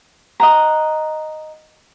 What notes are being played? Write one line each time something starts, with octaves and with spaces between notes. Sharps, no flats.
D#5 F#5 A#5